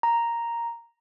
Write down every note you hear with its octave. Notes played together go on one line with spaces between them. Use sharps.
A#5